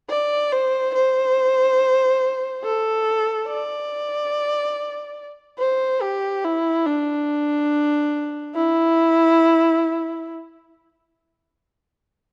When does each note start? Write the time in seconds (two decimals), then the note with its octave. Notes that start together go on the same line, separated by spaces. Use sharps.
0.10 D5
0.52 C5
0.95 C5
2.64 A4
3.48 D5
5.59 C5
6.02 G4
6.44 E4
6.86 D4
8.55 E4